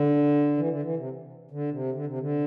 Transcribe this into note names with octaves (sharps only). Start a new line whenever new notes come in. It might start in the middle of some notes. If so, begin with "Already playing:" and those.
Already playing: D3
E3
D3
E3
C3
D3
C3
D3
C3
D3